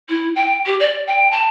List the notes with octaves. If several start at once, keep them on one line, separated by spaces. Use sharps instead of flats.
E4
G5
G4
D5
G5
A5